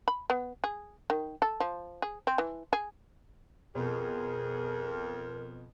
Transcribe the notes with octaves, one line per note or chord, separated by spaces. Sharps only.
B5
B3
G#4
D#3
A4
F3
G#4
C4
E3
G#4
F2 B2 G#4 A#4